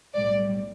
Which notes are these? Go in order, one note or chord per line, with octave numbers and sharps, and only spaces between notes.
B1 A2 G3 D5